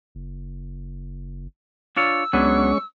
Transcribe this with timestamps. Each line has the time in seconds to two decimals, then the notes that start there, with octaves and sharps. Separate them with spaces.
0.15 F#1
1.96 D4 F4 C#5 E6
2.33 C#2 F#3 G#3 B3 C#4 D4 C#6